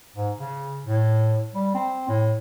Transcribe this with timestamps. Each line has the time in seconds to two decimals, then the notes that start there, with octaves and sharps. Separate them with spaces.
0.16 G#2
0.39 C#3
0.86 A2
1.54 G3
1.75 C4
2.09 A2